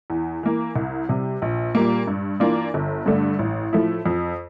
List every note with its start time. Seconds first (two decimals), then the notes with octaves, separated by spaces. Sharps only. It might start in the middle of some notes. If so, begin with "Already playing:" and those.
0.10 E2
0.43 E3 A#3
0.76 C2
1.09 C3 G3
1.42 A#1
1.75 A#2 G3 A#3
2.07 G2
2.40 E3 A#3 D4 F4
2.74 G1
3.06 G2 D3 A3 D4
3.39 A1
3.73 A2 F3 A3 E4
4.06 F2